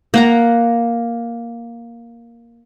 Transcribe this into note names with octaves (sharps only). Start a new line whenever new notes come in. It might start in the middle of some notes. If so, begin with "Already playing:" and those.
A#3 F#5 A#5